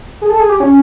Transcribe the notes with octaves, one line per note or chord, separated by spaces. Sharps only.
G#4
A4
G#4
G4
C#4